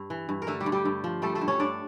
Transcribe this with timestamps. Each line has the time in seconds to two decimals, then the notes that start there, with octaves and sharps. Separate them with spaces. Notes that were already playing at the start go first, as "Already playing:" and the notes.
Already playing: G2
0.10 E3
0.29 G2
0.42 A#4
0.47 D3 A3 A4
0.60 G3 G4
0.66 G2
0.72 G3 G4
0.85 G2
1.04 F3
1.22 G3 A3 A4
1.35 A3 A4
1.41 G2
1.48 C#4 C#5
1.60 G2 D4 D5